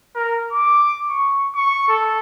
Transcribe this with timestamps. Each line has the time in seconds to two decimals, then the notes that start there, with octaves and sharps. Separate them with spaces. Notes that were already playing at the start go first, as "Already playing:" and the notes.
0.15 A#4
0.52 D6
1.10 C#6
1.55 C#6
1.88 A4